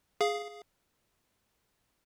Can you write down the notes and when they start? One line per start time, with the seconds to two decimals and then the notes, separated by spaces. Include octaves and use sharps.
0.21 G#4 F5